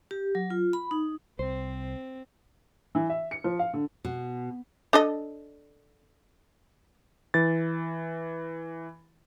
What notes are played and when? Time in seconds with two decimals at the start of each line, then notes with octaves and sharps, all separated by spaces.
0.11 G4
0.35 F#3
0.50 F4
0.73 B5
0.91 D#4
1.39 C2 C4 C5
2.95 E3
3.10 E5
3.31 C#7
3.44 F3
3.59 F5
3.73 D3
4.05 B2
4.93 D4 A4 D#5
7.34 E3 A6